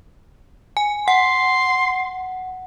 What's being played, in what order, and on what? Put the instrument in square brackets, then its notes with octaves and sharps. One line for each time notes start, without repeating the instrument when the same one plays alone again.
[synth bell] G#5
[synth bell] F#5 [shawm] C6